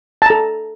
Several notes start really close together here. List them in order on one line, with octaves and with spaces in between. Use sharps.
A5 A#5 A4